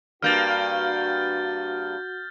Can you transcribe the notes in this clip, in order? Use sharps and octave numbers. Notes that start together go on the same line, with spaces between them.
G2 A#3 F#4 F6 G6 A6